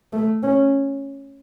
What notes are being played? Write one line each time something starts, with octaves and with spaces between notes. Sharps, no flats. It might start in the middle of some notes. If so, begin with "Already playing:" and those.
A3
C#4